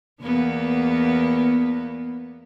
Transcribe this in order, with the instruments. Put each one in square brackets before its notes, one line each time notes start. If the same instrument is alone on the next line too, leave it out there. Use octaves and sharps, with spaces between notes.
[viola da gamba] E2 A#3 B3